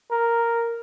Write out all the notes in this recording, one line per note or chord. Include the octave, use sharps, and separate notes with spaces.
A#4